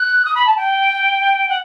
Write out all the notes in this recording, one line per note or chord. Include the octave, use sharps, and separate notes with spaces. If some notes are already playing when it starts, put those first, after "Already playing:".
Already playing: F#6
D#6
B5
A5
G5
F#5